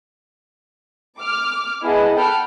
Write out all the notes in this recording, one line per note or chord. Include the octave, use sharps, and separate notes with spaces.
D6 F6
B3 E4 G#4 D#5 F#5 A5
A4 F#5 G5 A5 B5 F6